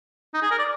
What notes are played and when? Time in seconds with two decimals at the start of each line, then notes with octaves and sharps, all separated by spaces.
0.34 D#4
0.42 G#4
0.51 A#4
0.59 D5